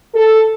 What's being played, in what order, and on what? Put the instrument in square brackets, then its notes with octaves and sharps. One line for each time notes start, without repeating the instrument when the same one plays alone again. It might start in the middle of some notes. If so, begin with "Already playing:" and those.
[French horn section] A4